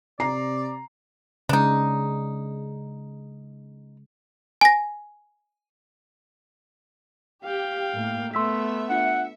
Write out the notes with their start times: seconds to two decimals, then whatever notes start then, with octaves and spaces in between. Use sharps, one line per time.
0.20 C3 D5 A#5 C7
1.49 C#3 G#3 D4 D#4
4.61 G#5 A#6
7.44 G4 F5 G5
7.95 A2 A#3
8.34 A3 B3 E5 C6 E6 B6
8.90 D4 F4 F#5 C#7